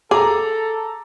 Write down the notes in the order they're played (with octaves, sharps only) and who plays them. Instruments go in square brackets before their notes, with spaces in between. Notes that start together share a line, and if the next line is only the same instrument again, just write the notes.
[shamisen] G#4 [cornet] A4 [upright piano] A#5 D6